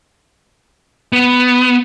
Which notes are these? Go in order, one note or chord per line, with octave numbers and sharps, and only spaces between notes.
B3